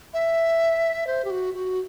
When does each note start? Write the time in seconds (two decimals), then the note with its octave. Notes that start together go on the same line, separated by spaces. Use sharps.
0.14 E5
1.07 C5
1.25 G4
1.30 F#4
1.54 F#4